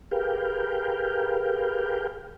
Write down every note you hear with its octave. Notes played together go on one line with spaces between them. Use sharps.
G4 G#4 A#4 B4 F5 G5